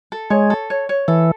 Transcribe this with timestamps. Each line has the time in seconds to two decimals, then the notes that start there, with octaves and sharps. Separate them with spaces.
0.12 A4
0.30 G#3 C#5
0.50 A4
0.70 C#5
0.89 C#5
1.08 E3 A4